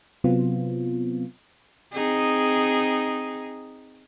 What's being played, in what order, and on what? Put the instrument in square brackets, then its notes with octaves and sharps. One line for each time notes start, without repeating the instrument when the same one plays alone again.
[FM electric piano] C3 F#3 B3 C4 F4
[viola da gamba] C4 D#4 G#4